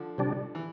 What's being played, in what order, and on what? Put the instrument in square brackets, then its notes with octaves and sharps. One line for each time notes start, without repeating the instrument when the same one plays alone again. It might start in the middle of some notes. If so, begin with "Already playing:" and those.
Already playing: [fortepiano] D3 F3
[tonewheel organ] C3 G3 D4
[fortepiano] E3